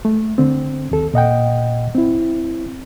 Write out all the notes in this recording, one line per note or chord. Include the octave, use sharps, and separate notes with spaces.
A3
D3 C4
D#2 A4
A#2 D#5 F#5 G5
C4 E4